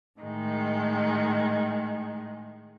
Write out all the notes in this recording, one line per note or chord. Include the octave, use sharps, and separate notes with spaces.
A2 D#3 G#3